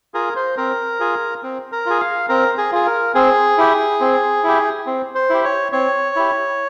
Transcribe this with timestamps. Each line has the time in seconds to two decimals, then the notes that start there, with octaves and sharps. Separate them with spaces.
0.14 F4 G#4 A#4
0.36 C5
0.57 C4 A#4
1.00 F4 G#4
1.43 C4
1.72 A#4
1.86 F4 G#4
2.00 F5
2.29 C4 A#4
2.58 G#4
2.72 F4 G#4
2.86 A#4
3.15 C4 G#4
3.58 E4 G4
4.01 C4
4.44 E4 G4
4.87 C4
5.15 C5
5.30 E4 G4
5.44 C#5
5.72 C4 C#5
6.16 E4 G4